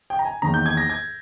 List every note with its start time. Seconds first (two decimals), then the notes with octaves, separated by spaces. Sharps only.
0.10 G5
0.19 A#5
0.25 G#5
0.42 E2 D#3 A#3 C#4 A#5
0.54 G6
0.66 G#6
0.77 A#6
0.90 G#6